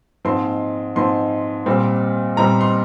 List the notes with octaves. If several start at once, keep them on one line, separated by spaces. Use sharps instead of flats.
G#2 F3 C4 C6
G#2 F3 C4 C6
A#2 G3 C4
A#2 G3 C4 A#5
C6